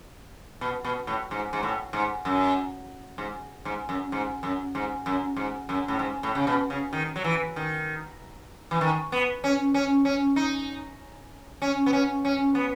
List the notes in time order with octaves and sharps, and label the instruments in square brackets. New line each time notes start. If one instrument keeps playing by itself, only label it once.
[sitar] B2
B2
A2
G#2
G#2
A2
G#2
F#2
G#2
G#2
F#2
G#2
F#2
G#2
F#2
G#2
F#2
A2
G#2
A2
C#3
B2
C#3
D#3
F#3
E3
D#3
E3
D#3
B3
C#4
C#4
C#4
D#4
C#4
B3
C#4
C#4
B3